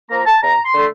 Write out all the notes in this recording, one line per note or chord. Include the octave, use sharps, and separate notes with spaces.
F3 A#3 A#5
A5
E2 A#5
C6
D3 A3